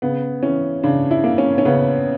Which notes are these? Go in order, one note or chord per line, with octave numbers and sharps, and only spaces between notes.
C#3 B3
E3 C#4
C#3 D4
E4
A#3
C#4
C#4
C#3 B3